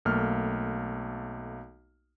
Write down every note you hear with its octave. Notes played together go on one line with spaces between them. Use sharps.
B1 A3 A#3 F6